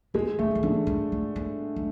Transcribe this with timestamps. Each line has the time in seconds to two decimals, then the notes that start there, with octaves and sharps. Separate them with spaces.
0.14 E3 G#3
0.39 D3 A3
0.55 F3
0.63 D3 E3
0.87 G#3
1.12 A3
1.36 B3
1.76 A3